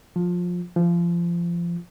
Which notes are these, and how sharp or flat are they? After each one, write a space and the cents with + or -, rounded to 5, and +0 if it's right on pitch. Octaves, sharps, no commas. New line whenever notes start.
F3 +20
F3 -25